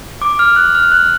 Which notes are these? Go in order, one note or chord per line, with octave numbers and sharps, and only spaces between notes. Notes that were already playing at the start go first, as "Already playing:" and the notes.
D6
F6
F#6
F6
F#6